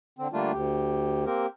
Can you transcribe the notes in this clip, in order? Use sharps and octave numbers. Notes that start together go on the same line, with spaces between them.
D3 C4
D3 G3 A3 A#3 D4 F4
D2 G4
A#3 C4 G4 A#4